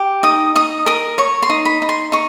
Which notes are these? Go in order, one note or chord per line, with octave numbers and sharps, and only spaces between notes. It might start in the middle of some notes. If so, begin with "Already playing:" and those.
Already playing: G4
D#4 D#6
D#4 D#6
A#4 D#6
C#5 C#6
C6
D#4
B5
D#4
C6
D#4 C#6